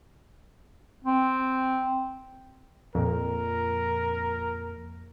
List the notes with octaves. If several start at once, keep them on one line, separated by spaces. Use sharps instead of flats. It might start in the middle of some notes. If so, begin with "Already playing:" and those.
C4
F2 A#2 A#4